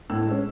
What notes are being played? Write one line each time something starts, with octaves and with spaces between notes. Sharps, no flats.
A2 E6
G#3 C#4